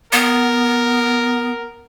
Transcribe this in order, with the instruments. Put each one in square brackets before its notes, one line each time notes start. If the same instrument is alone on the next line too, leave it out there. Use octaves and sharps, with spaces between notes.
[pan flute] B3 [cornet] A#4